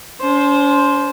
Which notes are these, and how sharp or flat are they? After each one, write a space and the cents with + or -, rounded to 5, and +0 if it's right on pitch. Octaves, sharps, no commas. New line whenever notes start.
C#4 +45 C5 +0